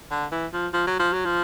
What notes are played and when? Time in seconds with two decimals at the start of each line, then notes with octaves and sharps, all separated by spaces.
0.11 D3
0.32 E3
0.53 F3
0.74 F3
0.87 F#3
0.99 F3
1.13 F#3
1.25 F3